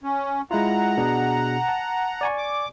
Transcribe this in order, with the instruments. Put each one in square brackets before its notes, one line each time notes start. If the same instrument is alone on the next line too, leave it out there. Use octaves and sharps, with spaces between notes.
[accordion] C#4
[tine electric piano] G#3 E4 F4 [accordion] F#5 A#5
[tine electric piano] B2 D4 G#4
A5
D5 G#5 C#6
[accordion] D6